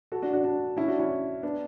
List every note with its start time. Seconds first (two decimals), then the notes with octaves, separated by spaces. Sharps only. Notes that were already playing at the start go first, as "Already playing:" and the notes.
0.12 F#4 A4
0.22 D4 F#4
0.33 D4 F#4
0.44 D4 F#4
0.77 C#4 E4
0.88 D4 F#4
0.99 C#4 E4
1.43 B3 D4